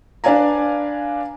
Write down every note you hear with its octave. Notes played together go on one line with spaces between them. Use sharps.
D4 B4 D5 F5 G#5 A#5